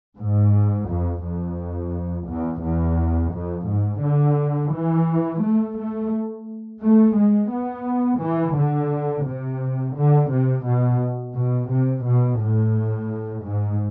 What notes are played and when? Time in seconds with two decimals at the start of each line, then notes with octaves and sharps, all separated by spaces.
0.20 G#2
0.90 F2
1.24 F2
2.29 E2
2.64 E2
3.33 F2
3.68 G#2
4.03 D3
4.73 E3
5.43 A3
5.78 A3
6.82 A3
7.18 G#3
7.52 B3
8.22 E3
8.57 D3
9.26 C3
9.96 D3
10.31 C3
10.66 B2
11.36 B2
11.71 C3
12.05 B2
12.40 A2
13.45 G#2